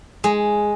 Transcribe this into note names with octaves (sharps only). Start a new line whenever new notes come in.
G#3